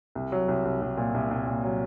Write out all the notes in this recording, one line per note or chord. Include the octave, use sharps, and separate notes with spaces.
C2
F#3
C2
C2
C2
A#2
C2
C2
A#2
F#3